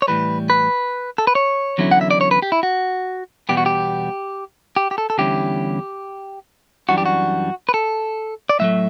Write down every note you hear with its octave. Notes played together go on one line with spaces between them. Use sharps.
C#5
A2 E3 G3 B4
B4
A4
B4
C#5
E2 D3 F#3 C#4 E4
F#5
E5
D5
C#5
B4
G4
E4
F#4
E2 B2 G3 B3 G4
F#4
G4
G4
G4
A4
A4
E2 D3 G3 C#4 E4 G4
F#2 E3 G3 D4 F#4
G4
F#4
B4
A4
D5
A2 F#3 A3 E5